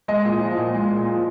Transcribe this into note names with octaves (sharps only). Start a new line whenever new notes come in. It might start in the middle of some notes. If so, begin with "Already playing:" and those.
G#3 D#5
A#2
F3
A#2
G#3
A#2
F3